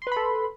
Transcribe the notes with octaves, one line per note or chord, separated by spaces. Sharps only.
A4 B4 B5 C6